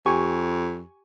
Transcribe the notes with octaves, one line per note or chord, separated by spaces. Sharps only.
F2 G4 G#5 C#6